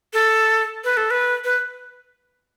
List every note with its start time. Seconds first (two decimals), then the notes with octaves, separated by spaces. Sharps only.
0.14 A4
0.84 B4
0.97 A4
1.11 B4
1.44 B4